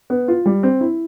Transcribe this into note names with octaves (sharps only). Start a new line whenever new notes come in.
B3
F4
G3
C4
E4